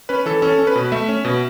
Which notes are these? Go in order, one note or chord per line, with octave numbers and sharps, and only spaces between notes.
C#4 B4
E3 A4
C#4 A4
C#4
B4
B2
A3 E5
C#4
B2